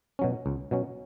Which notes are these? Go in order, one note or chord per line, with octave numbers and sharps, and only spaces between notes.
B2 F#3 C#4
C#2
B2 F#3 C#4